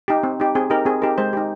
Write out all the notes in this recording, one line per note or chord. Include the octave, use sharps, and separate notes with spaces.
D#4 G4
C4
D#4 G4
C4 G#4
D#4 G4 A#4
C4 G#4
D#4 G4 A#4
G#3 C5
D#4 G4